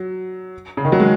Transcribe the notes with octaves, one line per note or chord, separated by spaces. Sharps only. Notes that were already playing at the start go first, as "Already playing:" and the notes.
Already playing: F#3
C#3
D#3
F#3
G#3